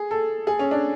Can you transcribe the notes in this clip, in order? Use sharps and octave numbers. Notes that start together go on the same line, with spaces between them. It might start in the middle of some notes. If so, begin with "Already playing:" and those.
Already playing: G#4
A4
G#4
C#4
D4